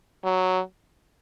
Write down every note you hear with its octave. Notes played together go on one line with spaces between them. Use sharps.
F#3